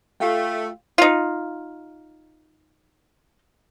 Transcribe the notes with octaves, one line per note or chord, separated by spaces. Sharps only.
A3 F4 F5 G5
D#4 F4